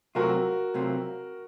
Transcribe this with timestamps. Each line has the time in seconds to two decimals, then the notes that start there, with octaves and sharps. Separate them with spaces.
0.15 C3 F#3 A3 C4 F4 F#4 A#4
0.74 C3 F#3 A3 C4 F4